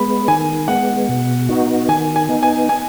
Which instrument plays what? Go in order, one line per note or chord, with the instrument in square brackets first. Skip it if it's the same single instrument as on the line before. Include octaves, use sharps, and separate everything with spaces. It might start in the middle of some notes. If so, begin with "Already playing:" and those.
Already playing: [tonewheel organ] G#3 B3 [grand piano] B5
[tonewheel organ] D#3 [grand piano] G#5
[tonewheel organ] G#3 B3 [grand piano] F#5
[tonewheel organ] B2
B3 D#4 F#4
[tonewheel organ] D#3 [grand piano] G#5
[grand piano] G#5
[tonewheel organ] B3 D#4
[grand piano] G#5
G#5